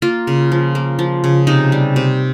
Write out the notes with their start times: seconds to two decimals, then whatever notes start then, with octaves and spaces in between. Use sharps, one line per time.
0.02 A#3 F4
0.27 C#3
0.52 F3
0.75 A#3
0.99 F3
1.24 C#3
1.47 C3 D#4
1.72 G3
1.96 C3